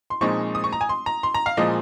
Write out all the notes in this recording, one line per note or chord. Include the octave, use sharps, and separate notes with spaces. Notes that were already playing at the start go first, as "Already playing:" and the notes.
C6
A#2 F3 G#3 C4 D#4 C#6
D#6
C#6
A#5
G#5
C6
A#5
C6
A#5
F5
A#2 F3 G#3 D#5